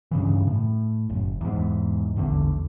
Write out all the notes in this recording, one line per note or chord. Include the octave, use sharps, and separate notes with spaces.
G2 C#3 E3
A2
F#1
E2 G#2
A#1 E2 D3